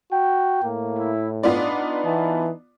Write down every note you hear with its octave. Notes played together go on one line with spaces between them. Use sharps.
F#4 G5
A2 A#3
E4
B3 D4 D#4 F4 D5
E3 A5